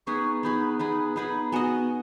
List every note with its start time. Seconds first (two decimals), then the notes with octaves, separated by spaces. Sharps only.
0.07 B3 D#4 G#4 B4 C#6
0.43 B3 D#4 G#4 B4 B5
0.79 B3 D#4 G#4 B4 B5
1.16 B3 D#4 G#4 B4 B5
1.52 B3 F#4 D#5 G#5